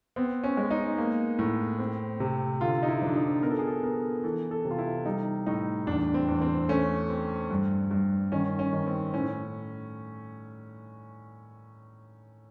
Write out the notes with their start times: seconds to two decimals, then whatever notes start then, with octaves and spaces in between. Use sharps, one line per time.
0.16 B3 C4
0.44 C#4
0.57 G#3
0.71 D#4
0.98 A#3
1.39 A2
1.79 C4
2.20 C3
2.61 D3 F4
2.83 D#4
2.88 E4
3.02 F3 D4
3.15 D#4
3.43 B3 A#4
3.50 A4
3.59 G#4
3.67 A4
3.83 B3 A#4
4.24 E3 A4
4.51 A4
4.65 C3
4.71 F4
4.79 E4
5.05 G3 D#4
5.46 A2 D#4
5.87 E2 D4
6.14 C4
6.28 E2
6.42 C4
6.69 A3 C#4
7.09 C4
7.51 G2
7.91 G2
8.32 D#3 C#4
8.59 C#4
8.73 D#3
8.87 C4
9.13 A2 C#4